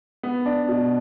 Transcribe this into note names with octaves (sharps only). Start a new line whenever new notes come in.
B3
D4
B2